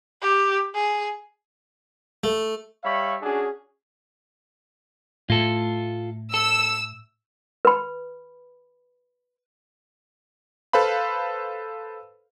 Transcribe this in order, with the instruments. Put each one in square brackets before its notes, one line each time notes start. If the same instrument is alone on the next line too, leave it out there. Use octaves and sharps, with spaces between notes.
[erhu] G4
G#4
[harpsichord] A3
[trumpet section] G3 C#5 E5 F5 B5 C#6
C#4 D4 F#4 G#4
[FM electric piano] A2 [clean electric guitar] F4 A4
[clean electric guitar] A4 [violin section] E6
[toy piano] B4 B5
[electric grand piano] A4 B4 C5 F5 B5